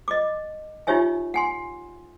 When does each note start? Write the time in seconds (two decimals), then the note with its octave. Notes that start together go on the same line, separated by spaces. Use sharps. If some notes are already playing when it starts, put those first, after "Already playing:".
0.08 D#5 D6
0.87 D#4 F4 G4 C#5 E5 G#5
1.34 F#5 G#5 C6